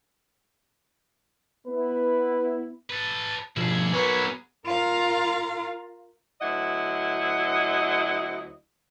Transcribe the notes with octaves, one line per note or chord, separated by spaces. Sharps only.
B3 E4 B4
A4 B4
B2 F3 E4 G#4
B3 F#4 A#4 B4 C#5
F4 A#4 F5 A#5
D2 F#3 E4 D#5 F#5